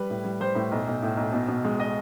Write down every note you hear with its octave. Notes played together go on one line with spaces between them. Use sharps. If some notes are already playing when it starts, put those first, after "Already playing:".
Already playing: G3 B4
A2
G3
G3 C5
A2
B1
B1
A2
B1
B2
B2
G#3
G#3 D#5